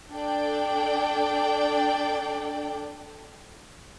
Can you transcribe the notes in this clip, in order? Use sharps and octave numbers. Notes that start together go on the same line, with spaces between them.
D4 A4 D5 G5